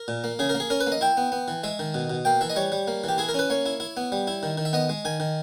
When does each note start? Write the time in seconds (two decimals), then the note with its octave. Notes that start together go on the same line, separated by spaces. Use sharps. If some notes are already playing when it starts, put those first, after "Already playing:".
Already playing: A#4
0.08 A#2
0.24 A#3
0.39 C#3 G#4
0.49 A#4
0.55 A#3
0.60 G#4
0.70 C#4 A#4
0.80 B4
0.87 A#3
0.92 D#5
1.01 E4 G5
1.17 B3
1.32 B3
1.48 E3
1.64 G#3 E5
1.79 D#3
1.94 B2
2.10 B2
2.25 A#3 G5
2.41 E3 E5
2.50 D#5
2.56 G3 C#5
2.72 G3
2.88 A#3
3.04 E3 G4
3.18 E4 G#4
3.29 A#4
3.34 C#4 B4
3.50 A#3 C#5
3.66 E4
3.80 E4
3.97 B3
4.12 G3
4.27 E4
4.43 D#3
4.58 D#3
4.65 E5
4.73 B3 D#5
4.89 G#3
5.05 D#3 G#5
5.20 D#3